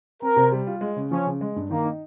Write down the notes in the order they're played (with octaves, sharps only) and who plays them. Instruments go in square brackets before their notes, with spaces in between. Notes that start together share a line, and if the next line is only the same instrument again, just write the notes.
[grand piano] C4 [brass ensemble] A#4
[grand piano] C3
G3
F4
G#3
C#3
[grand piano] F3 [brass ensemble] C#4
[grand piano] C#3
G#3
G2
[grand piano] D#3 [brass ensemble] A#3
[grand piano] D#4